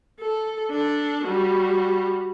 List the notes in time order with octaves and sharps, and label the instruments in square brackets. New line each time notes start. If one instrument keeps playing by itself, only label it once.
[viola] A4
D4 A4
G3 F#4